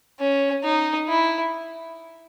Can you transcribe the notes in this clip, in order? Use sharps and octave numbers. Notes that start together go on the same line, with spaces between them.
C#4
D#4
E4